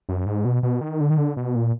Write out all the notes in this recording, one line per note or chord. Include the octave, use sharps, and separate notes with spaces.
F#2
G#2
B2
B2
D#3
D3
D#3
D3
B2
A#2